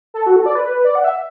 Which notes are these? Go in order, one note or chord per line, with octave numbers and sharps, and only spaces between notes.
A4
F#4
A4
D5
B4
B4
D5
F#5
E5